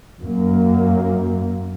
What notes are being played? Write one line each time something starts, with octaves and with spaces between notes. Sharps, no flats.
F#2 A#3